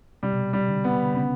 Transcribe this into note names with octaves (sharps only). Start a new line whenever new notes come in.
C3 G3
B2
C3
G3
D3
B3
D3
C#3 B3